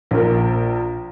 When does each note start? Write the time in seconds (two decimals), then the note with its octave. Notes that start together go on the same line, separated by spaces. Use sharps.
0.11 A#1 A#4